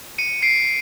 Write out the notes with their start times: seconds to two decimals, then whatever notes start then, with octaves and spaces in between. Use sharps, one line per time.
0.18 C#7 D#7
0.42 C7 D7